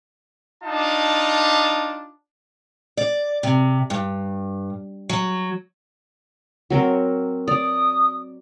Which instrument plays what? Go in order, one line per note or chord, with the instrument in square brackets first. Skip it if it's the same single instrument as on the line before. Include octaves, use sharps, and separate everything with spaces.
[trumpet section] D4 D#4 F4 A5
[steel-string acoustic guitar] D5
C3
G2
F#3
[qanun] F#3 C4 A#4
[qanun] D5 [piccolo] D#6